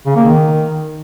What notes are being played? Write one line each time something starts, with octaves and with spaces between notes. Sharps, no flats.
C#3
A#3
D#3